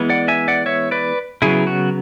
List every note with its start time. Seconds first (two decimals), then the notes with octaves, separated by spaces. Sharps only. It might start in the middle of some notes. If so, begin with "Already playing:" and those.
Already playing: E3 G#3 B3
0.10 D5 F#5
0.28 E5 G#5
0.48 D5 F#5
0.66 C#5 E5
0.91 B4 D5
1.42 C#3 F#3 B3 E4 G#4
1.67 F#4